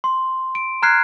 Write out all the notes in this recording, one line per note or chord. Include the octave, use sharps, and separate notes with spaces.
C6
D7
A#5 F6 F#6 G#6 C7